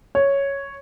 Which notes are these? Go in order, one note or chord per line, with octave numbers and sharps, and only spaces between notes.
C#5